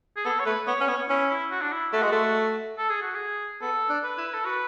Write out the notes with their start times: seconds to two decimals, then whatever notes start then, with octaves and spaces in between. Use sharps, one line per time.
0.17 G#4
0.25 B3 A4
0.40 C#5
0.46 A3 B4
0.67 B3 C#5
0.80 C#4
0.87 B3 C#5
1.09 C#4 E4
1.30 E4
1.51 F#4
1.62 D4
1.72 E4
1.93 A3 F#4
2.02 G#3
2.12 A3
2.77 A4
2.90 G#4
3.02 F#4
3.15 G#4
3.61 B3 A4
3.89 D4
4.04 B4
4.18 E4
4.34 A4
4.45 F#4 B4